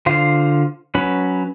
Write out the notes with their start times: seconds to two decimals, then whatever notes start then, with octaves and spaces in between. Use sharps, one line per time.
0.06 D3 F4 C5 F5
0.95 F#3 C#4 B4 B5